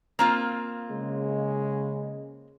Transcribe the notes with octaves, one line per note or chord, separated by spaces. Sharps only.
A#3 C4 F4
C#3 G#3